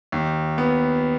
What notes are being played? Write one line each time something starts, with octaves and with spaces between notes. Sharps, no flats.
D#2
B3